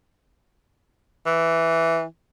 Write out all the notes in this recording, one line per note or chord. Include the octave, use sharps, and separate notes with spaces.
E3